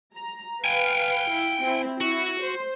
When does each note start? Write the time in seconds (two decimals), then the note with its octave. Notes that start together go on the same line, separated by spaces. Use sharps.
0.16 A#5
0.64 B4 F5 G5 G#5
1.32 E4
1.61 C4 E4
2.01 E4 F#4
2.40 C5